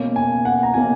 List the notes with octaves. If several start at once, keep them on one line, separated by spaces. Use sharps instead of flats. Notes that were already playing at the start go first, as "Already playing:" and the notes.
Already playing: B2 A#3 C#4
G#5
F#5
A#5
B2 A#3 C#4 G#5